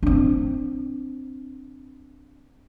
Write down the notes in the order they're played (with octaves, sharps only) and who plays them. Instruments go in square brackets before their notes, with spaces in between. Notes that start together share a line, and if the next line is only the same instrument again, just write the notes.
[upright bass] C4 D4